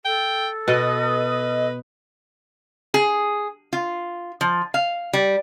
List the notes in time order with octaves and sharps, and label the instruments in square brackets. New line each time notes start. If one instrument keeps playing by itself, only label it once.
[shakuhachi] A4 [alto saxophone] G5
[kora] B2 [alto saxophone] B4 [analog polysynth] D#5
[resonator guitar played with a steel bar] G#4
F4
F3
F5
G3